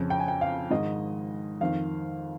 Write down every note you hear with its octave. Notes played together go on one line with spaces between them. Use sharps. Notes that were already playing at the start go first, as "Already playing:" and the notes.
Already playing: F2 C#3
G5
G#5
G5
F5
G#2 D#3 D#5
F2 D#3 F5